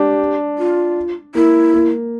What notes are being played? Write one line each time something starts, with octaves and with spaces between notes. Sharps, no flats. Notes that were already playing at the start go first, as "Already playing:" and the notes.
Already playing: D4 G4
F4
A#3 E4
A#3